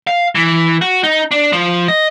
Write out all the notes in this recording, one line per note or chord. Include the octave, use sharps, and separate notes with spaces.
F5
E3
F#4
D#4
D4
F3
D#5